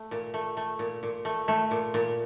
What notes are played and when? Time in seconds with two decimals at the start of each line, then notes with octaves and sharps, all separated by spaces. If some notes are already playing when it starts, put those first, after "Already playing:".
Already playing: A3
0.11 A#2
0.34 A3
0.57 A3
0.79 A#2
1.03 A#2
1.25 A3
1.48 A3
1.71 A#2
1.94 A#2